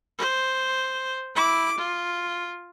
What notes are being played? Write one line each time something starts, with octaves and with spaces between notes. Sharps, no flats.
C5
E4 D6
F4